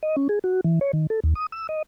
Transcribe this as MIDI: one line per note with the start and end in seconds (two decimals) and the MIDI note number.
0.03 0.16 75
0.17 0.28 61
0.29 0.39 68
0.44 0.61 66
0.64 0.79 52
0.81 0.91 73
0.93 1.07 51
1.10 1.20 69
1.24 1.34 39
1.35 1.46 87
1.52 1.67 88
1.69 1.82 75